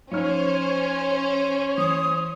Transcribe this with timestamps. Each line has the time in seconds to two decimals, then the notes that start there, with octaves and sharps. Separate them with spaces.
0.11 F3 C#4 D#4 C5 C#5 F6
1.78 E3 D#6